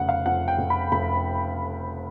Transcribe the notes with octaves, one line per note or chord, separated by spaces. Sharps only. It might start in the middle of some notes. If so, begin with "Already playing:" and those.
Already playing: F1 C#3 F#5
F5
F2 F#5
G5
F1
B5
F1 B5